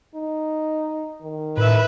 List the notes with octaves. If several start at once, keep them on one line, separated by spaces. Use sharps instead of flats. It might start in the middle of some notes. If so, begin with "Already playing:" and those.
D#4
D#3
A2 B4 E5